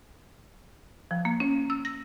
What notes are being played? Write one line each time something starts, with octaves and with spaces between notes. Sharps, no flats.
F3
A#3
C#4
E6
A#6